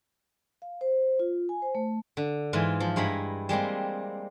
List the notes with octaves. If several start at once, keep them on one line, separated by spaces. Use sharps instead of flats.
F5
C5
F4
G#5
C5
A3
D3
G#2 E3 F4
F3
G2 G#3 E4 A#5 B5
G3 G#3 A#3 C4